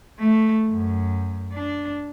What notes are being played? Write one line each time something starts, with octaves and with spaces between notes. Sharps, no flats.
A3
F#2
D4